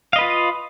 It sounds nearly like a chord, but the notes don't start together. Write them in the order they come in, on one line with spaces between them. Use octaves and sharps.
F5 D#5 B4 F4